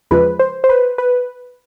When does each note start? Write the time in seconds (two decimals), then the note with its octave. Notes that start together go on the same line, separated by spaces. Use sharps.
0.11 E2 C#3 F3 G#3 B4
0.39 C5
0.64 C5
0.69 B4
0.98 B4